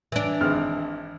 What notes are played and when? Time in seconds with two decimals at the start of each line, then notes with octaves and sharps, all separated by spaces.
0.12 E3 D4
0.41 G#1 F6